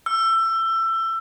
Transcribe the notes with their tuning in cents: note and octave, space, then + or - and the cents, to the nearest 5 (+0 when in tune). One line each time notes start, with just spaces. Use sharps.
E6 +20